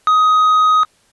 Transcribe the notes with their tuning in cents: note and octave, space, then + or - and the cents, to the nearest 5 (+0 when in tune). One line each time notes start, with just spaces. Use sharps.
D#6 +15